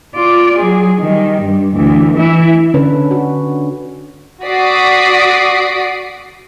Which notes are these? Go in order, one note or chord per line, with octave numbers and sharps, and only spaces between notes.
F4 D5
F#3 G#4
D#3 G3
G2
D2 E3
E3 E4
D3 C#4 D4 B4
F#4
F#4 D5 D#6 B6 C7 D7